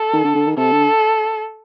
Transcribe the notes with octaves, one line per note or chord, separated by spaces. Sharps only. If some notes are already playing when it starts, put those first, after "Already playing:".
Already playing: A4
D#3
D3
D3
D#3
C3 A4
D3